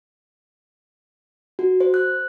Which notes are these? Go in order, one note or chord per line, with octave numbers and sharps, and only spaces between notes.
F#4
C5
F#6